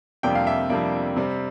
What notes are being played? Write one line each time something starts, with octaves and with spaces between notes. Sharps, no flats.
F2 C3 G3 A#3 D4 G5
F5
E5
F2 C3 G3 A#3 D4
C3 G3 C4